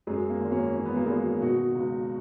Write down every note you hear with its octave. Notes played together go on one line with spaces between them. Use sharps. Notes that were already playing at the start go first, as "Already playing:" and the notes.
F#2 G#3
A#3
G#1
A#3 C#4
E3 C#4
B3
A#3
G#1 G#3 B3
B2 D#4 F#4
C#2